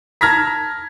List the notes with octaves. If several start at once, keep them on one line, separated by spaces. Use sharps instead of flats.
A5 A#5 F6 G#6 A#6 B6